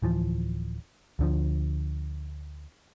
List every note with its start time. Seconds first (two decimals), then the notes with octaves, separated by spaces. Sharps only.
0.02 D1 E3 F3
1.19 D2 D3 F3